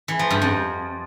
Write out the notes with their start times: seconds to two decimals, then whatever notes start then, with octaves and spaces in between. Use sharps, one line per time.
0.08 E3
0.19 F3
0.30 G2
0.42 F2